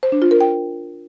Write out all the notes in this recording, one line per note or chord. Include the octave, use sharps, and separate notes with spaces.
C5
D4
F4
A#4
G5